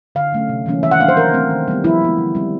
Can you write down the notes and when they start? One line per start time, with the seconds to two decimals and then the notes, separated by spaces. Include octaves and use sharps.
0.15 D3 F5
0.32 F#3 A3 C#4
0.49 C3
0.66 E3 G3 A#3 C#4
0.83 D#3 E5
0.91 F#5
1.00 F#3 A#3 D4 F5
1.08 C5
1.17 E3 A#4
1.34 A3 C4
1.50 D#3
1.68 G3 B3
1.84 F3 E4
2.01 G#3 B3
2.18 D3
2.35 G3 C4